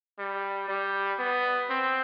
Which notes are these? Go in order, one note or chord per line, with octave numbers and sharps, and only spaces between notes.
G3
G3
B3
C4